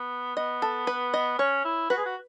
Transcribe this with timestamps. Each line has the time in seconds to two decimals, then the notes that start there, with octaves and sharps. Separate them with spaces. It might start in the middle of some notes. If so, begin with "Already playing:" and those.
Already playing: B3
0.36 B3 D#5
0.62 A4
0.87 B4
1.14 D#5
1.39 C#4 C#5
1.65 E4
1.90 F#4 B4
1.97 G#4
2.05 F#4